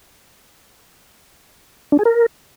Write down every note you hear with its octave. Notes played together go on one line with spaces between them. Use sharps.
D4
G#4
A#4